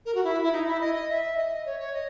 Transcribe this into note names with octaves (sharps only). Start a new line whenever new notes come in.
A#4
F#4
E4
E4
D#4
E4
D#5
D#5
E5
D#5
C#5
C#5
D#5